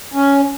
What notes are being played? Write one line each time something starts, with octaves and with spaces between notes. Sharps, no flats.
C#4